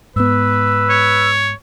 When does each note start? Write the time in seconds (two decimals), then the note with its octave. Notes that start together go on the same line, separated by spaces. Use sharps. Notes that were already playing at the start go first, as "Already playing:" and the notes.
0.16 G#2 B3 B4 E6
0.89 C#5